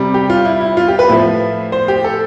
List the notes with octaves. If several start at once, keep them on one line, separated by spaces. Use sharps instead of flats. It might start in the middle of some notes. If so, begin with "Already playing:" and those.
Already playing: C3 G3
G4
F4
E4
E4
F4
G4
B4
A2 F3 E5
C5
G4
A4